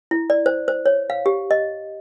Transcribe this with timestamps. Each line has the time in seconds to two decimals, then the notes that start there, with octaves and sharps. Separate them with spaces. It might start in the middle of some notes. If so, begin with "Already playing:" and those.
0.11 E4
0.30 D5
0.46 C5
0.68 C5
0.86 C#5
1.10 F5
1.26 G4
1.51 D#5